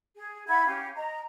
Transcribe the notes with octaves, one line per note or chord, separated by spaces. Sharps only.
G#4
E4 F#5 B5 G#6
C#4 G4 F5
D#5 A#5